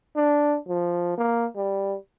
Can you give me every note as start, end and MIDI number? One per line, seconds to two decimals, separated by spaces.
0.16 0.57 62
0.67 1.15 53
1.18 1.46 58
1.56 1.96 55